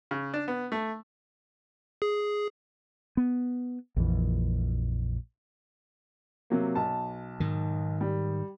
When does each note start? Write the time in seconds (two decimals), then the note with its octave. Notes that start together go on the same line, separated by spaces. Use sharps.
0.11 C#3
0.34 D4
0.48 B3
0.72 A3
2.02 G#4
3.17 B3
3.96 A#1 F2 E3
6.50 C3 F#3 A#3
6.75 B1 A5
7.40 G#2 D#3
8.01 G3